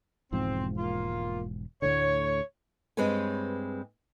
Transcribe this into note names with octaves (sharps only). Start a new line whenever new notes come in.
E1 G#2 F3 C4
A#3 F4
D2 A2 D3 C#5
G2 G#3 C4 B4 C#5 G#5